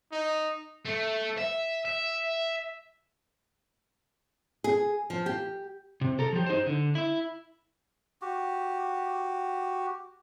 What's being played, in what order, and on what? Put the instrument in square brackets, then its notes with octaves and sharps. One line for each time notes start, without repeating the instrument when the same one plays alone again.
[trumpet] D#4
[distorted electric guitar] A3
E5
E5
[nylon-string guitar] G#4
F3
G4
[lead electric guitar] C3
A4 A#5
F3 G4
D#4 C5
D3
E4 E5
[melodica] F#4 G4